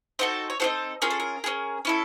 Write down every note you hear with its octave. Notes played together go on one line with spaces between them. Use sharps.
C4 D#4 F#4 A4 C5
C#5
C4 D#4 F#4 A4 C5
C#4 F4 G#4 A#4
A4
A#4
C#4 F4 G#4
C#4 E4 A4